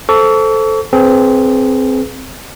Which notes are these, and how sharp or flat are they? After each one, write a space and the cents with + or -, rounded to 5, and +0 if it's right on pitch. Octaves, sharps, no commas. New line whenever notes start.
A4 +0 C5 +0 C#6 +40
C4 +0 G#4 +30 B4 +0